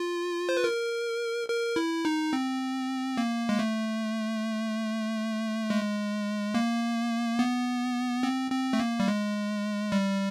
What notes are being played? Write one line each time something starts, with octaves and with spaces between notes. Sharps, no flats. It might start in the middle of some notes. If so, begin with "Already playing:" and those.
Already playing: F4
C5
B4
A#4
A#4
E4
D#4
C4
A#3
G#3
A3
G#3
A#3
B3
C4
C4
A3
A#3
G3
G#3
G3